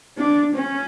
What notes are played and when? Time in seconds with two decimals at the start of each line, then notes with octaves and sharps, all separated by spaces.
0.18 D4
0.55 C#4